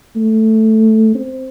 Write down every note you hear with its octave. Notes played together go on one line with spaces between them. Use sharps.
A3
C4